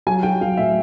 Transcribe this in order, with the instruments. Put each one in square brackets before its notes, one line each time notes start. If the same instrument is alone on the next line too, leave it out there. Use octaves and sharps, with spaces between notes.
[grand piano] F#3 G#5
F#3 G5
F#3 F5
A2 E5